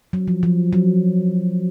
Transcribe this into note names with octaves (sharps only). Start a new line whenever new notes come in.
F#3
F3
F3
F#3